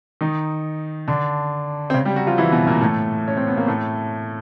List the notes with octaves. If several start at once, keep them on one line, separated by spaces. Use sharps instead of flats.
D#3 D#4
D3 D4
C4
C#3 C#4
G3 G4
F#3 F#4
F3 F4
E3 E4
B2 B3
A#2 A#3
A2 A3
C#4
C4
B3
A#3
A2 A3